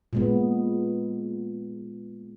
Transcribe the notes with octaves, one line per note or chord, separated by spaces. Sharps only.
A#2 G#3 B3